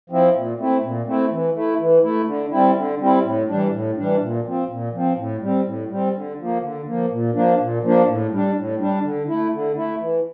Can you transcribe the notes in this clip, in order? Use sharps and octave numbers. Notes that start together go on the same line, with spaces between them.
F3 C4 E4
A#2
A3 C4 E4
A#2
A3 C4 E4
E3
A3 E4
E3
A3 E4
D3
G3 C4 E4
D3
G3 C4 E4
A2
E3 G3 D4
A2
E3 G3 D4
A#2
F3 C4
A#2
F3 C4
A2
G3 C4
A2
G3 C4
D3
F3 A#3
D3
F3 A#3
A#2
F3 A#3 D4
A#2
F3 A#3 D4
A2
G3 D4
A2
G3 D4
D3
A3 E4
D3
A3 E4
E3